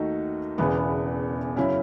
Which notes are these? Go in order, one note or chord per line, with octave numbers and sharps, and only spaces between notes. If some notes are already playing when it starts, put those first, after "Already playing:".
Already playing: D#2 D#3 A3 D#4 F#4
E1 E2 C#3 E3 B3
F#2 C#3 F#3 C#4 E4